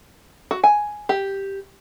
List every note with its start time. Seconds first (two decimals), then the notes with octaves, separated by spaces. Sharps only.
0.51 F#4
0.64 G#5
1.09 G4